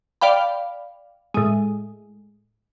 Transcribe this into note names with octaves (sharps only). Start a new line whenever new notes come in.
D5 F5 G5 B5
A2 G#3